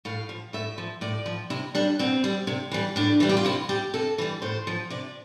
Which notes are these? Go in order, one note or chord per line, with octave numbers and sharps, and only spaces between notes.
A2 F5
F3
A2 E5
F3
A2 D5
F3
C3 E4
G3 D4
B2 C4
G3
C3
E3 G3
A2 D4
E3 G3
G4
F4
C3 E4
G3 G4
C3 A4
E3 G3
A2 C5
F3
C3 D5